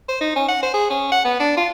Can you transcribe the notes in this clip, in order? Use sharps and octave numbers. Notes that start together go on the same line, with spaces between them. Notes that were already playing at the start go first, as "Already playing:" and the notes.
C5
D#4
C#4
F#5
C5
G#4
C#4
F#5
B3
D4
F4